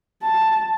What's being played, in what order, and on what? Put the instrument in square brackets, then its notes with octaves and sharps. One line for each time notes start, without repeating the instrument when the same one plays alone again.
[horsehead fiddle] A5